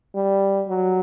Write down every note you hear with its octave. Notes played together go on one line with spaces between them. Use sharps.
G3
F#3